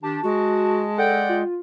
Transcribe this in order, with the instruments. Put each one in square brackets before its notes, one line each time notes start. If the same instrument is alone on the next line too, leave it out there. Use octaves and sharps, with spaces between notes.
[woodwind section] D#3 D4 G4 [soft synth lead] A5
[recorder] G#3 [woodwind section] F#4
[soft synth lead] A4 [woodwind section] D5 F#5 G5
[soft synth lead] F4